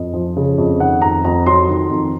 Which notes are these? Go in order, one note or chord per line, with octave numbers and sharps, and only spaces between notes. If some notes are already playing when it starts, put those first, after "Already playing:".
Already playing: F2 D#5
F3
C#3
F2
D#3 F#5
F2 A#5
F2 A#5
F#3 C6
D#3
F2